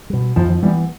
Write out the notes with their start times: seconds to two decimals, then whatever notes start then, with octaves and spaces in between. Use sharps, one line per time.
0.10 B2 G3
0.36 F2 F3
0.49 F3
0.62 E3 G3
0.66 B3